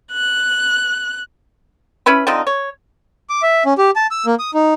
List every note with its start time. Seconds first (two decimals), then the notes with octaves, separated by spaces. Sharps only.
0.12 F#6
2.06 C#4 E4 B4 B5
2.27 D3 F3 C4 D#4
2.47 C#5
3.29 D6
3.42 E5
3.66 C#4
3.78 G4
3.96 A5
4.11 E6
4.26 A#3
4.39 D#6
4.54 D#4